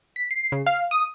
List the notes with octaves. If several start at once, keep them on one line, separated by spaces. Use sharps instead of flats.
B6
C7
C#3
F5
D#6